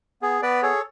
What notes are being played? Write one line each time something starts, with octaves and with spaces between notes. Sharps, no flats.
B3 G#4
B3 B4 D5
G#4 A4 C#5